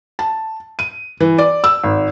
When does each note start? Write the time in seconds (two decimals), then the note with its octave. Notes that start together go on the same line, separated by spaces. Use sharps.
0.19 A5
0.79 D#7
1.20 E3
1.38 D5
1.64 E6
1.84 G#1